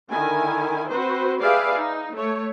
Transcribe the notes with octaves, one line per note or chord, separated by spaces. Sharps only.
D3 D#3 E4 G#5
C4 F#4 B4 C5
G4 G#4 B4 D5 E5 F5
D#4
A3 C#5